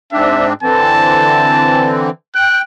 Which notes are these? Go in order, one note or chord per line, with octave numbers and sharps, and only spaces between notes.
G#2 C4 D4 E5
D3 E3 C4 A5
G5 F#6